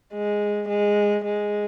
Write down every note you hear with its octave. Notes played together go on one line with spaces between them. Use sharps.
G#3
G#3
G#3